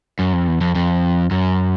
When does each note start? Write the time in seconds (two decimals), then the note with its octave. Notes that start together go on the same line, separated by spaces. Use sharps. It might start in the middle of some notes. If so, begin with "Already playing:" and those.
0.19 F#2
0.33 F2
0.47 E2
0.61 F2
0.75 F2
1.31 F#2